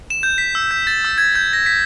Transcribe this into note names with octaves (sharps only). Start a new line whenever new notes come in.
E7
G6
B6
E6
G6
A6
E6
G#6
G6
A#6
B6